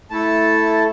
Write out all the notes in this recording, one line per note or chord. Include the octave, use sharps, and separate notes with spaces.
A3 E4 A4 A5